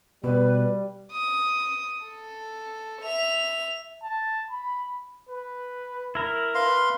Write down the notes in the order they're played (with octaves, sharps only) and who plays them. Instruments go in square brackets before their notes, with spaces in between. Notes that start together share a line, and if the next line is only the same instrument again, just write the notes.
[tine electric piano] B2 [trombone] G3 [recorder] B4
[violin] D#6
A4
E5 F7
[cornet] A5
B5
B4
[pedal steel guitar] E4 A#4
[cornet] B4 [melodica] F5 C6